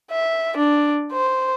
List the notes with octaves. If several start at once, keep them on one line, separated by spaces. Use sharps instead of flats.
E5
D4
C5